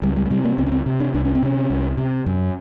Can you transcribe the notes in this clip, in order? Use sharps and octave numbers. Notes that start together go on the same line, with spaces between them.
C#2 G3
G3
G#3
C3 G3
A#3
C#2 C4
C#4
C4
C3
D4
C2 D4
C#4
C4
C3 C#4
C2
C3
F#2